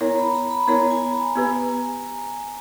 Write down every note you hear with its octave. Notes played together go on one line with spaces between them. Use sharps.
B3 E4 A#4 C#5 A#5
B5
A#5
B5
B3 E4 A#4 C#5 A#5
G#5
A#5
B3 G4 B4 A#5
G#5